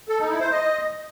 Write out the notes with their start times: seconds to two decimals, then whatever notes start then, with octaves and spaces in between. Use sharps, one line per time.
0.09 A4
0.19 D#4
0.30 E4
0.41 C5
0.51 D#5